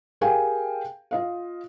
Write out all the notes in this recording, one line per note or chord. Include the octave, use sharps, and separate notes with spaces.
G4 G#4 A#4 F5 G5 G#5
F4 D#5 F5